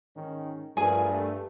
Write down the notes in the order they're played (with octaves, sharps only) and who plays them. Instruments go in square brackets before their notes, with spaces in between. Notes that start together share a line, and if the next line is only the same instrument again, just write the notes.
[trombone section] G#2 D#3 C#4
[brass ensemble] G2 [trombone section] F3 A3 A#4 [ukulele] G#4 G#5
[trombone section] A3